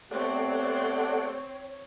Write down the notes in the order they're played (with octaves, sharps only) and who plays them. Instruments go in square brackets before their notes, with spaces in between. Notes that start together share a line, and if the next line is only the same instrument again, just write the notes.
[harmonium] A3 B3 G4 [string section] C4 [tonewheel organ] A4 D5 F#5 [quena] C#5